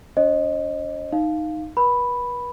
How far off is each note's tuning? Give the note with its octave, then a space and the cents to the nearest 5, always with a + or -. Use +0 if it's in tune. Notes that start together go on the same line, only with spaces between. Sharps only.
D4 -45 C5 +45 D#5 -10
D#4 +0 F5 +0
B4 -35 B5 +0